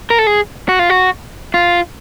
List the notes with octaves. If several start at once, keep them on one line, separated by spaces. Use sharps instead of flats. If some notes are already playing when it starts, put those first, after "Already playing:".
A#4
A4
G#4
F#4
F4
F#4
F4